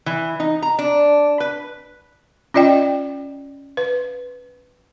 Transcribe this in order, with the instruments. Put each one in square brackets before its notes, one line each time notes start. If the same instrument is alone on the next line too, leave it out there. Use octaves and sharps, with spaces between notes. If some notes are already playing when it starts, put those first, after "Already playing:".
[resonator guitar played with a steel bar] E3
D#4
A#5
D4
B4
[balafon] C#4 F4 D5 D#5 G5
B4